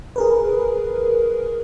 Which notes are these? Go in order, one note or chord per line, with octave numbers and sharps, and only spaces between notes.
G#4 A#4 B4